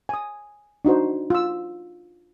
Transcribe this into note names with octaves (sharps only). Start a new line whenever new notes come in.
G#5 D#6
D4 D#4 F#4 C5
F4 E6